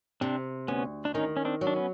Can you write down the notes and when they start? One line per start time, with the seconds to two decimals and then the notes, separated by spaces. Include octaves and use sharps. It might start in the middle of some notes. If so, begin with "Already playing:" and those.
0.21 C3 C4 D4
0.68 D2 B3 C#4
1.05 D4
1.14 D#3 C#4 D#4
1.37 C#4
1.45 C4 D4
1.61 F#3
1.67 D4
1.76 B3 C#4